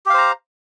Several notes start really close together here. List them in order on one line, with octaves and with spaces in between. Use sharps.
G4 F5 C5 A#5